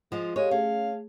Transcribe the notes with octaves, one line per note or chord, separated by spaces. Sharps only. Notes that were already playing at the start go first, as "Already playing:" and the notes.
F3 G#3 F4
G#3 G4 A4 C#5 F5
A3 C#4 G#4 F5